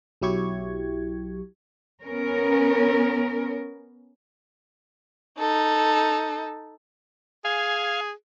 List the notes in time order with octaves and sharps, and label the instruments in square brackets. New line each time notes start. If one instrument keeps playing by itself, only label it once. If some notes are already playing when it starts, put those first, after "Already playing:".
[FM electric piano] B1 F#3 E4 G4 C#6 G#6
[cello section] B3 C#4 A#4
[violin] D#4 A4
[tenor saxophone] G#4 [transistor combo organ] F5 G#5